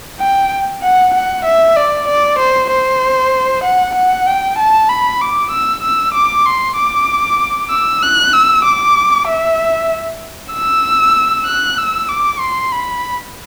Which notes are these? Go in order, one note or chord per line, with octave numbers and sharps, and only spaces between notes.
G5
F#5
F#5
E5
D5
D5
C5
C5
F#5
F#5
G5
A5
B5
D6
E6
E6
D6
C6
D6
E6
F#6
E6
D6
E5
E6
F#6
E6
D6
C6
B5